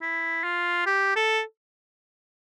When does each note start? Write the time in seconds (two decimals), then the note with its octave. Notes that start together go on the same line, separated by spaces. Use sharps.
0.02 E4
0.44 F4
0.86 G4
1.16 A4